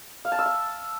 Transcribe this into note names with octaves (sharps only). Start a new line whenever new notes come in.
F5
A5
E6
E5